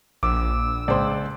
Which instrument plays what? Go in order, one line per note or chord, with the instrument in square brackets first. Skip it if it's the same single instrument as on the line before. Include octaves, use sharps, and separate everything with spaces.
[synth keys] A#1 [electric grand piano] D6 [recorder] E6
[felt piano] C#2 C5 [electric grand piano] D5 C6